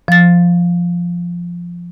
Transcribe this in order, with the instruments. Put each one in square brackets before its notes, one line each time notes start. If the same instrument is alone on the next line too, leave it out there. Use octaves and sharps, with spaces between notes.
[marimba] F3 A6